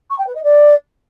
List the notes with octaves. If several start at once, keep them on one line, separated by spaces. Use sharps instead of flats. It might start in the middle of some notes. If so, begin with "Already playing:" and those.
C#6
G5
B4
D#5
D5